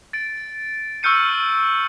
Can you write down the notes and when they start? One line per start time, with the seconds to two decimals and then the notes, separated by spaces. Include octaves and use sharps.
0.13 A6 D7
1.03 C#6 E6 F6 G6 C#7 D#7